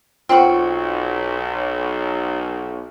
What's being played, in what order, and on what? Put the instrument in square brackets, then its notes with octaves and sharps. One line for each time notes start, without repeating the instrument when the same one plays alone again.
[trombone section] B1 [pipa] C4 F#4 [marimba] F4 C5 F#5